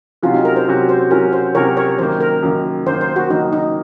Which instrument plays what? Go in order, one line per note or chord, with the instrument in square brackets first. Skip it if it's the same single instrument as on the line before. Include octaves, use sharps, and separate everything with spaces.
[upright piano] C3 F#3 C#4 F#4 [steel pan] F4
[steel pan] D#4
A#4
C5
[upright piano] C3 F#3 C#4 F#4
[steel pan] C5
[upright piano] C3 F#3 C#4 F#4 [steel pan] A#4
[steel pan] C5
[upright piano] C3 F#3 C#4 F#4 [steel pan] A#4 C#5
[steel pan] A#4 C#5
[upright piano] F#2 D#3 A#3 [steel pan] C5
[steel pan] A#4
[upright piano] F#2 D#3 A#3
[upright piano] F#2 D#3 A#3 [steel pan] C5
[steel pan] C5
F#4
[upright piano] F#2 D#3 A#3 [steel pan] D#4
[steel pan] D#4